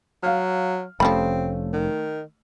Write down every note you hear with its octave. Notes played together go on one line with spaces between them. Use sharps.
F#3 F5 F6
F1 F3 G3 A3 C4 C#4 B5
D#3